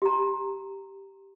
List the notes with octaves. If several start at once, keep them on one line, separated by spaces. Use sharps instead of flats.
G4 A#5